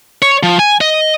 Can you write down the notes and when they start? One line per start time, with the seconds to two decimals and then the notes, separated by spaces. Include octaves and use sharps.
0.22 C#5
0.43 F3
0.59 G#5
0.81 D#5